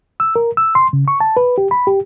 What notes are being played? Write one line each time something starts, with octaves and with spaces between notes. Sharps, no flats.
E6
A#4
E6
C6
C#3
C#6
A5
B4
G4
B5
G4